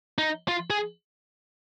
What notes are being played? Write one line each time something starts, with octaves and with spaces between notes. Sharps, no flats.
D#4
F4
G#4